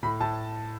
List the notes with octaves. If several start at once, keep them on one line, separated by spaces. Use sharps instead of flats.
A2 B5
A2 A5